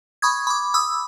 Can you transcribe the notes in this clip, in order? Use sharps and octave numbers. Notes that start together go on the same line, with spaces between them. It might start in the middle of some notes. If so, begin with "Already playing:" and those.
B5 C#6 D#6 G#6
B5 D6
B5 D#6 E6